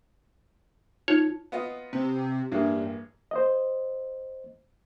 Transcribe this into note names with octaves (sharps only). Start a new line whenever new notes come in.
D#4 F4 C#5
B3 F4 D#5
C3
A1 G2 A#3 G#4
C5 D#5